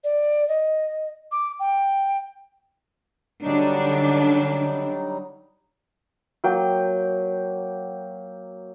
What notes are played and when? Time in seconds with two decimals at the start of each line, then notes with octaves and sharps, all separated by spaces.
0.04 D5
0.48 D#5
1.32 D6
1.60 G5
3.43 D3 F#3 G3 D4 D#4
6.44 F#3 A#3 G5